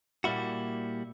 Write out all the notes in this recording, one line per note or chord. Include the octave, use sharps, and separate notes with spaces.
A#2 G3 A#3 E4 F#4